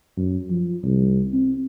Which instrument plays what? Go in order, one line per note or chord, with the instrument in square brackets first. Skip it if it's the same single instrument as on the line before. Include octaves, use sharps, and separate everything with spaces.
[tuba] F#2
F3
C2
C4